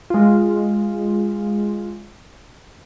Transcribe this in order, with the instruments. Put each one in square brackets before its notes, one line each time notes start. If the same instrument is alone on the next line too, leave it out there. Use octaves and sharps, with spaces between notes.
[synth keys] G#3 F4